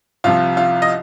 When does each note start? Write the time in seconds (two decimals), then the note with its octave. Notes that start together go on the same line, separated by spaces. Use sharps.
0.24 C2 C3 F3 F4
0.57 F4
0.82 D#5